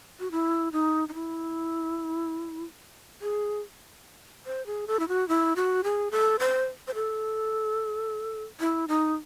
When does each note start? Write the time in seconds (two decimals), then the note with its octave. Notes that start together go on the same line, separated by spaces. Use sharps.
0.20 F#4
0.31 E4
0.73 D#4
1.09 D#4
1.14 E4
3.22 G#4
4.46 C5
4.66 G#4
4.87 A4
5.00 E4
5.08 F#4
5.29 E4
5.56 F#4
5.84 G#4
6.11 A4
6.40 C5
6.88 C5
6.95 A4
8.60 E4
8.88 D#4